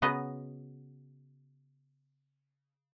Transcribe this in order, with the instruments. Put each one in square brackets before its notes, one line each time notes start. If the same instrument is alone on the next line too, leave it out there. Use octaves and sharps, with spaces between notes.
[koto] C#3 B3 F#4 B4 D#5 A#5